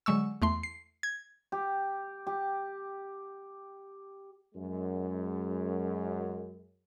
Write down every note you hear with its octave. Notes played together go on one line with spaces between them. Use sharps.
D3 F#3 G#3 C#6 E6
E2 A3 C6
C7
G#6
G4
G4
F#2 G#3